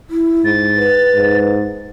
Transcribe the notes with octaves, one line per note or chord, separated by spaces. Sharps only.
E4
G#2 A6
B4
G#2